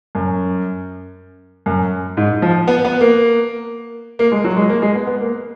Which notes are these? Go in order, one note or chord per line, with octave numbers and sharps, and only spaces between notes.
F#2
F#2
G#2
F3
B3
B3
A#3
A#3
G#3
F#3
G#3
A#3
G#3
B3
B3
A#3